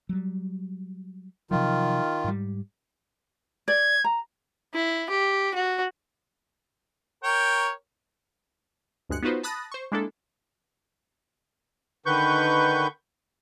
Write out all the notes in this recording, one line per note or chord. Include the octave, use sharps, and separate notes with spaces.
F#3 G3
C3 D#3 F3 F#3 F4
G#2 G3
D5 G#6
A#5
E4
G4
F#4
A#4 C#5 G5
D2 G2 G#3 F#6 C#7
B3 D#4 F4 F#4 B4 C5
A5 B5 D#6 F#6 A6 A#6
C5 C#6
G#3 A#3 D4 E4 A4
D3 D#3 B4 C#6 G6